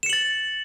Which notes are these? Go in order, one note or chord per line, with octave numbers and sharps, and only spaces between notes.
A6 C#7 E7 F#7